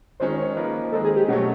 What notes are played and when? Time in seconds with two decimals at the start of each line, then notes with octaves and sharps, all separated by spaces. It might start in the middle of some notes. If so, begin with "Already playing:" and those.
0.20 D#3 G#3 C#4 C5
0.38 C#5
0.55 F3 A#3 D#4 B4
0.92 D#3 G#3 C4 D#4 A4
1.04 G#4
1.16 G4
1.28 B2 F#3 A3 C#4